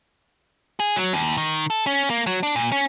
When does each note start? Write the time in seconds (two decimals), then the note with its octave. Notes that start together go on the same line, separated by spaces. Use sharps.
0.80 G#4
0.96 F#3
1.13 D#2
1.37 D#3
1.70 A4
1.86 C#4
2.10 A#3
2.27 F#3
2.43 D4
2.56 A#2
2.72 C#4